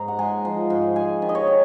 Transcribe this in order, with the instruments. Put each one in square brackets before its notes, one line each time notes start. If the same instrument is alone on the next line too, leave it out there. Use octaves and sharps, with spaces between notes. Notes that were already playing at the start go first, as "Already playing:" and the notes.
Already playing: [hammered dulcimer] G#2 A#5
F#5
G#3 G#5
F3
G#2
G#3 G#5
D#3
D#5
C#5
D#3